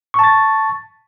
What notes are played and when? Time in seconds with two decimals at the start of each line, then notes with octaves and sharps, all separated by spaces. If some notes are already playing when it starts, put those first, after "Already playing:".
0.14 C#6
0.19 A5
0.24 A6